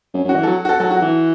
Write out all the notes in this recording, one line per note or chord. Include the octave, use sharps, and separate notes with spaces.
F#2
F#2 F#4
E3
F#3 A4
F#4
A4
F#3 A4
F#4
E3